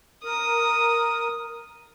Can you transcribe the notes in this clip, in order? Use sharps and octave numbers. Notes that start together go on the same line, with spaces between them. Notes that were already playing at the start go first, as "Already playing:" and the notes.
A#4 D#6